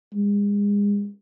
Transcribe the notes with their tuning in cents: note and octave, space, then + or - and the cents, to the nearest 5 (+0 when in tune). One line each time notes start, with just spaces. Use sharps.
G#3 -35